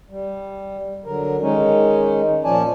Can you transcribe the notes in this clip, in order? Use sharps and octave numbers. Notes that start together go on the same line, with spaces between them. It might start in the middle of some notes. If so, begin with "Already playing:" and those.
G3
D3 F#3 A#4
D#3 G#3 C#4 D#4
A#2 F3 C#4 D5 G#5 A5